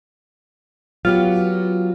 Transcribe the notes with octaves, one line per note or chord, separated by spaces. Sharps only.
F#3 B3 F4 G4